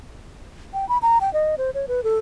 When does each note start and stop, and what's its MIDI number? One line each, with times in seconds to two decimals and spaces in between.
0.74 0.88 79
0.89 0.98 83
1.02 1.18 82
1.21 1.32 79
1.34 1.55 75
1.58 1.71 72
1.75 1.86 73
1.88 2.04 71
2.04 2.19 69